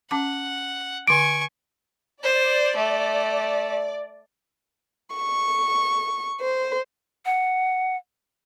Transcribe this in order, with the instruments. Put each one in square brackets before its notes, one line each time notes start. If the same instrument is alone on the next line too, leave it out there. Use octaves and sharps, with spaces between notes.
[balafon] C#4 A5 D6 [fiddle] F#5
[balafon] D3 D6 [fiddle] G#5 C#6 [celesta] D7
[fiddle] C5 [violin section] D5
[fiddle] A3
[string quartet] C#6
C5
[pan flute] F#5